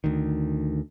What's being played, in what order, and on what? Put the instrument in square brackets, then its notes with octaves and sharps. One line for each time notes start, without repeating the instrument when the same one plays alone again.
[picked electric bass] D2 D#3